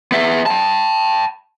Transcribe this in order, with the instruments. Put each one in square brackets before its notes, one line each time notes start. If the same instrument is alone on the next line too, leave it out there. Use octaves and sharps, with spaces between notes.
[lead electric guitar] B3 E5
G5 A5